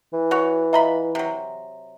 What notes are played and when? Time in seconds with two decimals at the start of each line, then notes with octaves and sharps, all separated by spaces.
0.13 E3
0.31 F#4 C#5
0.73 F4 D#5 E5 A#5 B5
1.15 C3 F#3